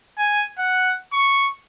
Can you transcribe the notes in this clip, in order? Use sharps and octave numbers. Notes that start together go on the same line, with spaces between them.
G#5
F#5
C#6